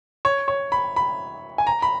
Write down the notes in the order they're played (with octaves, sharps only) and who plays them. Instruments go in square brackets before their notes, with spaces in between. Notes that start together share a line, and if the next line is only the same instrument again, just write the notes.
[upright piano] C#5
C#5
B5
B5
G#5
A#5
B5